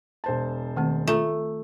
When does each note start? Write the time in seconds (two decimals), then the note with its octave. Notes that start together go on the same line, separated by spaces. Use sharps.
0.24 E1 C5 A5
0.76 D#3 A3 C4
1.07 A3 F4 A#5